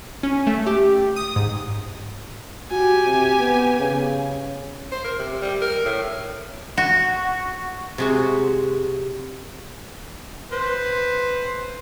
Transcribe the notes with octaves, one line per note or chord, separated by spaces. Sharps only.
C#4
A3
G4
D#6
G#2
F#4 G4 G#5
C3
B3
C#3
C5
A#4
C3
G3
A#4
A2
F#4
C3 G#3 F#4
B4 C5